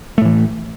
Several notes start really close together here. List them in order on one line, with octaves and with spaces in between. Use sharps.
A3 A2 E3